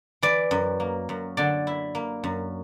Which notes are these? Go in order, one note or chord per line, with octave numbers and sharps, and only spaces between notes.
E3 D5
F#2
A#3
F#2
D3 D5
E4
A#3
F#2